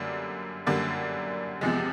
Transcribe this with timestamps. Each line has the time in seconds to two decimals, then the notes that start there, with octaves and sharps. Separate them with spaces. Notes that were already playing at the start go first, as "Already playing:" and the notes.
Already playing: F#2 D3 G3 A#3
0.67 F#2 D3 G3 A#3
1.61 E2 C3 F3 G#3